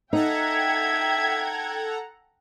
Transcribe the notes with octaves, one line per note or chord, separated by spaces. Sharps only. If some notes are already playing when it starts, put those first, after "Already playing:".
D#4 A4 E5 F#5 G5 A#5 G#6